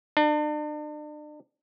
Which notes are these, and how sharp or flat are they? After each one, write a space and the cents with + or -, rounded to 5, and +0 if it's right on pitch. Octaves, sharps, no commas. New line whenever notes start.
D4 +40